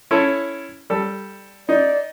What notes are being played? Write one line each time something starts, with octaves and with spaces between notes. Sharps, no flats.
C#4 E4 A4
G3 A4
D#4 D5